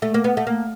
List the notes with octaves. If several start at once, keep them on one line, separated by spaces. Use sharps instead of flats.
A3
A#3
B3
A3
A#3